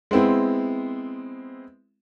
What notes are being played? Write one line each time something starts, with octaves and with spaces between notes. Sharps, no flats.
G#3 B3 C4 E4